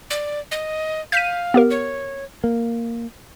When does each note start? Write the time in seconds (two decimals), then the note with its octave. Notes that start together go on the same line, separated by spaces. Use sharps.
0.10 D5
0.51 D#5
1.12 F5 G6 B6 D#7
1.54 B3 G4 A#4
1.70 C#5
2.44 A#3